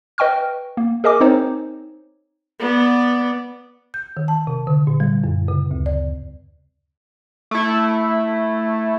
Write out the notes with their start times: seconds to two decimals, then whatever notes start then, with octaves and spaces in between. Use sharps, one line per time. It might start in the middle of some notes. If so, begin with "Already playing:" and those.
0.18 B4 D#5 G5 C#6 F6
0.77 A#3
1.04 G#4 A#4 D#5 G#5 D6
1.21 C4 D#4 C5 C#5
2.59 B3 D5
3.94 G6
4.17 D#3
4.28 A5
4.47 C3
4.67 D3
4.87 A#2
5.00 G3
5.24 F#2
5.48 C#3
5.71 D2
5.86 D5
7.51 A3 E4